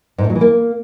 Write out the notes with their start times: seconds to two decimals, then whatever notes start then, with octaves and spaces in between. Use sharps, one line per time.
0.18 G#2
0.24 A2
0.30 F#3
0.35 E3
0.41 A#3